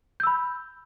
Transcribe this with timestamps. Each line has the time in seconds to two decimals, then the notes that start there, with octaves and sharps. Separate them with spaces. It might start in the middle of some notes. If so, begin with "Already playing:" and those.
0.20 G6
0.23 E6
0.27 B5